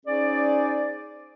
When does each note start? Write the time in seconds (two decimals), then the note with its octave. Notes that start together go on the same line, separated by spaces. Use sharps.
0.06 C#4 D#4 G#4 C5 D5